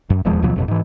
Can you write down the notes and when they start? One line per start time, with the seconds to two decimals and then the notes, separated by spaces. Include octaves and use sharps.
0.10 F#2
0.25 D#1 E2 F3 G#3
0.42 D2 B2 F3 F#3
0.56 G1 F2 B2
0.68 G#2 E3